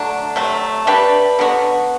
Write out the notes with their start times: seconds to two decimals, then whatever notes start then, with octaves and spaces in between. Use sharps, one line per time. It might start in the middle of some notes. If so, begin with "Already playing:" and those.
Already playing: D3 F#3 A3 D4
0.36 C3 F#3 A3
0.87 G3 D4 G4 B4
1.39 D3 F#3 B3 F#4